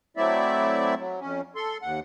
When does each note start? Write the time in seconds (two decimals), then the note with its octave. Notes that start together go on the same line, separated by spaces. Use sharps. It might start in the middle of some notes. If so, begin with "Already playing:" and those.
0.17 F#3 A3 C4 E4 D5 E5
0.98 F#3
1.20 F2 C#4
1.55 A4 C6
1.82 D#2 F#5